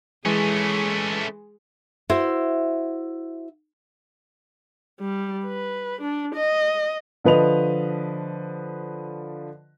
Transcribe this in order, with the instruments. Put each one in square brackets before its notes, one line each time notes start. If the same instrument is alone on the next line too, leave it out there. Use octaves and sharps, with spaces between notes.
[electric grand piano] E3 G#3 [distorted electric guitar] A3 C#4 [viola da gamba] G#4
[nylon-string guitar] E4 F#4 C5
[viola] G3
B4
D4
D#5
[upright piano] D3 F3 B4 D#5 F7